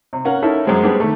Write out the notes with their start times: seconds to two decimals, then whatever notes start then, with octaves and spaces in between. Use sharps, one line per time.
0.13 C3
0.25 C#4 A#4 F5 F#5
0.42 C#4 D#4 E4 A4 A#4
0.66 F#2 G#3 C4
0.83 G3 G#3 B3 C4 D4
1.00 D#3 A3